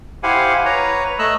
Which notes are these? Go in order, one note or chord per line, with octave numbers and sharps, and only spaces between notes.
E4 G4 C5 F5 F#5 G#5
B4 C#5 A#5
A3 D#5 E6 F#6